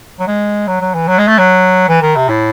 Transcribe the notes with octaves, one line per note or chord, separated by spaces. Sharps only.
F#3
G#3
F#3
F#3
E3
F#3
G#3
A3
F#3
E3
D#3
C3
A2